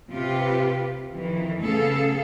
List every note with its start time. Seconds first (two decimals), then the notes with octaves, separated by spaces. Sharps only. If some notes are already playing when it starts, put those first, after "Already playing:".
0.11 C3 F4 G4 B4
1.13 F2 D#3 E3
1.64 C#3 A3 B3 G#4 A4 F5